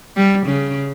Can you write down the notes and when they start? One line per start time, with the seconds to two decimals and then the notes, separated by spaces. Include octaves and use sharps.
0.17 G3
0.47 C#3